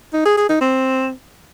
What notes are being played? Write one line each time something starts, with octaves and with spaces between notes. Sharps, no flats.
D#4
G#4
G#4
D#4
C4